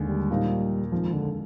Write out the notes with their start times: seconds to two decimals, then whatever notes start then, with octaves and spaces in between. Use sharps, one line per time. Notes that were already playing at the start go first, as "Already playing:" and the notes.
Already playing: D#2 D3 G#3
0.09 G3
0.30 A#2 F3 A#3 D#4 G4
0.92 F2 D#3 F3 G#3
1.13 D3